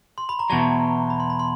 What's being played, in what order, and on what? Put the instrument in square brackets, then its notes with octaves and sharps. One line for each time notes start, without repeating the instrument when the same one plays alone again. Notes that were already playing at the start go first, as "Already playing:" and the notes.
[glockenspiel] C6
B5
A#5
[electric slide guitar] E2 B2 F#3 [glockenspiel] A5
[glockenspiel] B5
C6
B5
C6